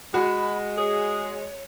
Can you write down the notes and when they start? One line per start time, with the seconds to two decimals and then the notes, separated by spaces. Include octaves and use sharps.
0.14 G#3 F#4 B5
0.77 G#4 C#5